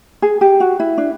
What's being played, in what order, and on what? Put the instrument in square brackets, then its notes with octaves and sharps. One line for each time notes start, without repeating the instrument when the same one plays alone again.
[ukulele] G#4
G4
F#4
E4
D4